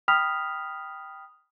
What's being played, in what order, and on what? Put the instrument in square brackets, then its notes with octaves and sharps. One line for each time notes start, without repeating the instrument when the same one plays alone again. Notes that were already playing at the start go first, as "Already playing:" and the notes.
[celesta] G5 B5 D#6 F6 B6 F7